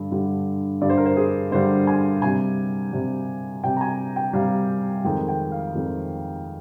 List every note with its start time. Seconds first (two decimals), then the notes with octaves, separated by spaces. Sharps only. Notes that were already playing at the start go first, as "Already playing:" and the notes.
Already playing: G2 D3 G3
0.11 G2 D3 G3
0.81 G2 D3 G3 D5
0.89 C5
0.97 A#4
1.06 C5
1.17 G#4
1.52 G2 D3 G3 C5
1.87 G#5
2.22 C3 G3 G#5
2.93 C3 G3
3.64 C3 G3 G5
3.77 A#5
3.81 G#5
4.16 G5
4.33 C3 G3 F5
5.05 F2 D#3 G#3 G5
5.28 G5
5.52 F5
5.75 F2 D#3 G#3